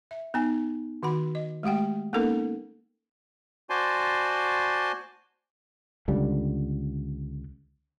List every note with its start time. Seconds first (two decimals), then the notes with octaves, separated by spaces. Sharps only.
0.11 E5
0.34 B3 D#4 G#5
1.03 D#3 F#4 F#5 B5
1.35 D#5
1.63 G#3 A3 G4 F#5 G5
2.13 A#3 B3 C#4 D#4 A4 A#4
3.70 F#4 C5 D5 G#5 A5 C6
6.08 C#2 D3 G3